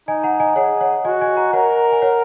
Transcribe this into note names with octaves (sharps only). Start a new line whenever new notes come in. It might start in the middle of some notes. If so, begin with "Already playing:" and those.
D#4 D#5 G#5
F#5 A#5
D#5 G#5
G#4 C#5 F#5
C#5 F#5
F#4 D#5 G#5
D#5 G#5
F#5 A#5
A#4 C#5 F#5
G#5
C#5 F#5